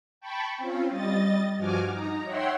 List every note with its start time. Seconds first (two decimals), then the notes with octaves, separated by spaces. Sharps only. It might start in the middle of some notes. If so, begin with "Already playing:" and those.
0.21 G5 A5 B5 C#6
0.57 C4 C#4 F4
0.89 G3 D#5 A6
1.57 G2 F3 F#4 G#5 D6 F6
1.88 D#4 A#5
2.24 C#5 E5 F#5 G5 C6